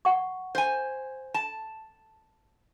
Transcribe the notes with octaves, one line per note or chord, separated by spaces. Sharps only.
F#5 C#6
C5 G#5
A5